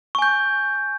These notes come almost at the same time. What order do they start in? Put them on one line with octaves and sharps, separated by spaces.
C#6 G#5 G6